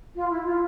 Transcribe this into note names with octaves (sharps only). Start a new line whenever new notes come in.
F4
E4
F4